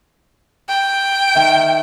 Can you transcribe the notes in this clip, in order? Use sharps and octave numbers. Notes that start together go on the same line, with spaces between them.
G5
D#3 E5